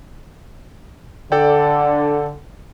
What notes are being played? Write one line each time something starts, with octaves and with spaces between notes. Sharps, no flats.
D3 A4 D5 G5